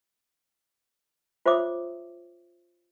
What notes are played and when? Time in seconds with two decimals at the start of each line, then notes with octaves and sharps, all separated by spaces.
1.46 F4 C5 C#5 E5 D6 D#6